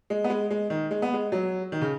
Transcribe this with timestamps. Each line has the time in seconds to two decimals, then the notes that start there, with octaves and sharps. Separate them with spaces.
0.10 G#3
0.24 B3
0.30 G#3
0.51 G#3
0.70 D#3
0.91 G#3
1.02 B3
1.14 G#3
1.32 F#3
1.72 D#3
1.82 C#3